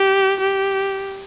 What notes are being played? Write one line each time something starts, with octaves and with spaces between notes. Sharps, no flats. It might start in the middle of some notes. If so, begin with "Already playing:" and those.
Already playing: G4
G4